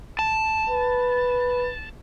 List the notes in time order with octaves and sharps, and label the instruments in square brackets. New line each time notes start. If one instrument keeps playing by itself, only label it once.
[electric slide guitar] A5
[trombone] B4